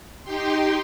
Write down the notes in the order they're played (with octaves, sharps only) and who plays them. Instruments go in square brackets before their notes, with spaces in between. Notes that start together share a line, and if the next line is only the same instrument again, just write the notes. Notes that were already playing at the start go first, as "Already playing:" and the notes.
[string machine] D#4 G4 G5 C6